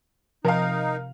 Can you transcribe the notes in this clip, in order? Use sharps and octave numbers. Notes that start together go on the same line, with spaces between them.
C3 F3 D#4 A#4 F5